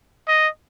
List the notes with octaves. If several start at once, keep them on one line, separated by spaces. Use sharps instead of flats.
D#5